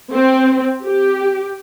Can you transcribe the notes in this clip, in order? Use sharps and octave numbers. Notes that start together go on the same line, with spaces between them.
C4
G4